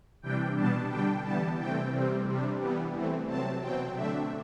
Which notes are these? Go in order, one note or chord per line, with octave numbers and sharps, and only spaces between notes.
C3 E3 G3 D4 G5
B2 G3 B3 D4 A5
D3 G3 D4 G5
E3 G3 B3 A5
C3 E3 A3 C4 G5
C3 G3 C4
C3 G3 D4
E3 G3 B3
E3 A3 C4
C3 F#3 C4 A5
B2 F#3 C4 G5
D3 A3 D4 E5